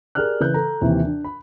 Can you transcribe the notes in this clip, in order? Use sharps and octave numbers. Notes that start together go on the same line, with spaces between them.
G4 G#4 A#4 D5 F6 F#6
C#3 E3 B4 F#6 G6
A4 A#5
D#2 C3 E3
D4
B5